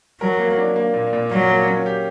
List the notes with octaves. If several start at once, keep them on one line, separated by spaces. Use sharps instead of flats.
F#3 A#4
A#3
D4
A#3
A#2
A#2
F#3 A#3
A#3
C#4
G4